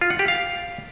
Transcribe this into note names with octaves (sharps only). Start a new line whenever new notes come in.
F4
F#5
G4
F5